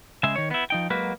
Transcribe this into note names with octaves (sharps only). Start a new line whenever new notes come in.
C#3 G#3 G#4 E5
D#3 C#5
B3 E4
F3 D#4 G5
F#3 G#3 A#3 F#4 B4